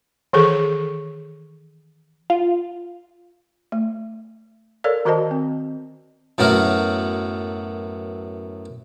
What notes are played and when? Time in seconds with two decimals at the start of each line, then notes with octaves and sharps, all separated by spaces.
0.33 D#3 E3 G#4 A4
2.30 F4
3.72 A3
4.84 A4 A#4 C#5 D5 F5
5.05 D#3 F#4 A#4 C5 D#5 A5
5.31 C4
6.38 F#2 A2 F#3 B3 A#4